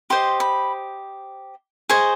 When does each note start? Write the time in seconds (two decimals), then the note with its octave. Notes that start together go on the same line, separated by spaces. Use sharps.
0.10 G4 C5 D#5 C6
0.40 B5
1.89 G#4 C5 D#5 C#6